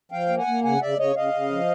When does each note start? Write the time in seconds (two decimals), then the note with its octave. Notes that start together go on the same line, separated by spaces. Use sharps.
0.12 F3 F5 G5
0.29 A#3
0.38 F#5 G#5
0.47 A#3
0.64 C#3 F#5 G#5
0.82 C#3 D5 E5
0.99 C#3 C#5 D#5
1.16 C#3 D#5 F5
1.34 C#3
1.51 F3